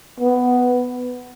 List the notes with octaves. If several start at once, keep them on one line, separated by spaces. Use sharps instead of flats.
B3